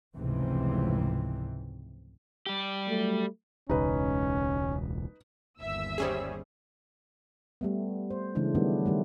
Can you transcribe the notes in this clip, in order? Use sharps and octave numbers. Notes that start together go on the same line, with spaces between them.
F1 C#2 G#2 C3 E3 C4
G3 G4
F#3 A3
E1 C#2 C#4 D#4 B4
G1 D#2 E5 E6
G3 C#4 G4 G#4 C5
G3 A3 B3
C5
C#3 E3 G#3 A3 D4
D#3 F#3 G3 A3 B3 D4
D#3 G3 A3